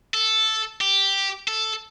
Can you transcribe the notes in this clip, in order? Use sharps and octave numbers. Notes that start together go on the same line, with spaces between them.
A4
G4
A4